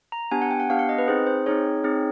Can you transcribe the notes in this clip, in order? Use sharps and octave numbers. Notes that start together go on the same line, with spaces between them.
A#5
B3 D4 G4 G#5
F#5
G5
F#5
B3 D4 G4 F5
F#5
D#5
B4
C4 D#4 G#4 C5
C5
C4 D#4 G#4 C#5
C4 D#4 G#4